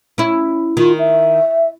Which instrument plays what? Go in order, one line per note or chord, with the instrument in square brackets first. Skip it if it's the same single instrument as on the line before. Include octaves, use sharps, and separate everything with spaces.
[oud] C#4 E4
[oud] D#3 [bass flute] F4
[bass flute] E5